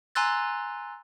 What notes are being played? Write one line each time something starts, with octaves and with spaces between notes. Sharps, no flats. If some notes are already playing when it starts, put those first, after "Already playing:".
G#5 A#5 C6 E6 F#6 A6